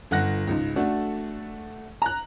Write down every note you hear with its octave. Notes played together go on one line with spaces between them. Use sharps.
G1 F#5 F#6 A#6
C#2 G#2
A3 D4 F#4 A4
A#5 F#6